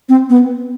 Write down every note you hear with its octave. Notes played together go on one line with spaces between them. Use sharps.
C4
B3